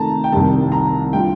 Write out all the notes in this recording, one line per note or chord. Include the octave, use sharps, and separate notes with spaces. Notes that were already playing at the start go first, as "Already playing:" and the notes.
Already playing: C3 D#3 A3 A5 A#5
G5
C2 C3 D#3 G3 A5
A#5
D3 G3 D4 F4 G5